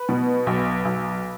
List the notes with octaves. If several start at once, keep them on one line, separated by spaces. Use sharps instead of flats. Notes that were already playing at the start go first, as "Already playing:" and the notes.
Already playing: B4
B2
B1
B1